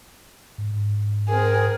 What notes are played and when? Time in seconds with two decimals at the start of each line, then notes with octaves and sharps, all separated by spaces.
0.58 G#2
1.29 C4 G#4 A#4